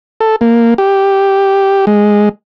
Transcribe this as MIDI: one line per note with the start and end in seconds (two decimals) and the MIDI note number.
0.21 0.36 69
0.41 0.74 58
0.78 1.85 67
1.87 2.29 56